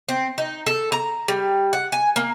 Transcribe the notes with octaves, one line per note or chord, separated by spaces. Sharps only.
C4
D#4
A4
A#5
G3
F#5
G#5
A#3